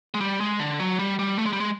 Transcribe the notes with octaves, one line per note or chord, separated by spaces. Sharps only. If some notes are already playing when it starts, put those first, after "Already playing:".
G#3
G3
G#3
D3
F#3
G3
G3
A3
G#3
G3
G#3